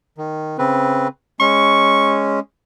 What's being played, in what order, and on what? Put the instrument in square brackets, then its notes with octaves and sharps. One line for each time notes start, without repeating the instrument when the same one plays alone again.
[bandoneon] D#3
C#3 C4 B4
[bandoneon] G#3 C#4 [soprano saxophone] C#6